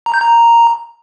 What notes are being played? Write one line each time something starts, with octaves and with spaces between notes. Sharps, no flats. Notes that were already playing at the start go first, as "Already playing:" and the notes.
A#5
G6
A#5